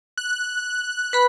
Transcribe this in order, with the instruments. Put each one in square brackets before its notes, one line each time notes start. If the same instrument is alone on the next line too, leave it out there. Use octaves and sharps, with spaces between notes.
[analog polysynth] F#6
[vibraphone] B4 B5